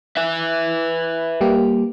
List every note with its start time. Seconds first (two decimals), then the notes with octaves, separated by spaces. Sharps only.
0.17 B4 E5
1.41 G3 A#3 G4